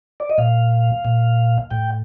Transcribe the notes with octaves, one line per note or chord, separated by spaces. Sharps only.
D5
D#5
A#2 F5
A#2
A2 G5